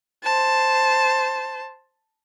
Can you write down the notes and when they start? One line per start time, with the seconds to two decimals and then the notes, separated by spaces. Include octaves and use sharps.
0.24 C5 A5